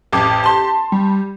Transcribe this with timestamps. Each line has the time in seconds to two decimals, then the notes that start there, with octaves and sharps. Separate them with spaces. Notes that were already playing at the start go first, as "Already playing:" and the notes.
0.13 A1 F2 G4 D6
0.44 A5 C6
0.92 G3